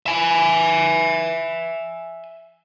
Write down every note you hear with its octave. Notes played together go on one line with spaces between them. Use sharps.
E5 G#5